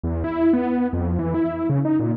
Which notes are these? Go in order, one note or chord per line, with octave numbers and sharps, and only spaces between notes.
E2
E4
B3
F2
E3
E4
C#3
D#4
A#2